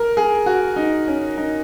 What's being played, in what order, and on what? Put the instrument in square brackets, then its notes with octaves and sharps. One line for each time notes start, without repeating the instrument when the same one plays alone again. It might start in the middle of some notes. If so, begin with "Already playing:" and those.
Already playing: [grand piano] A#4
G#4
F#4
D#4
C#4
D#4